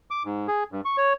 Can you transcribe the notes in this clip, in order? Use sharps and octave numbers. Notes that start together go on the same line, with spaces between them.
D6
G#2
G#4
G2
C#6
C#5